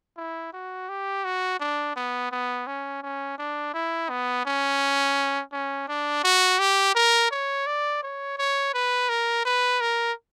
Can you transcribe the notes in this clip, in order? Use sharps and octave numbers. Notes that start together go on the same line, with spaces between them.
E4
F#4
G4
F#4
D4
B3
B3
C#4
C#4
D4
E4
B3
C#4
C#4
D4
F#4
G4
A#4
C#5
D5
C#5
C#5
B4
A#4
B4
A#4